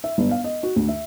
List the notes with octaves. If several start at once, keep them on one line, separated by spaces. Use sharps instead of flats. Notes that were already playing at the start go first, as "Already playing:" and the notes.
E5
G1
F5
D#5
F#4
D2
E5